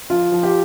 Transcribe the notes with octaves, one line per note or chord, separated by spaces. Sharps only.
F3 F4
F3
G4